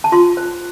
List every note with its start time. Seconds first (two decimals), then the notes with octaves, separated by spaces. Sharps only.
0.04 A5
0.12 F4 C6
0.37 C5